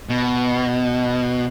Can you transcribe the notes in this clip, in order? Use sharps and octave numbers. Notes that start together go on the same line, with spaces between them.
B2